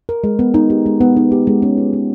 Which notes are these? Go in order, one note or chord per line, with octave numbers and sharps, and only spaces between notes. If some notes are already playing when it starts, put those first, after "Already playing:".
A#4
G#3
B3
D#4
G4
G#3
B3
D#4
G4
G#3
C#4
F4
G#3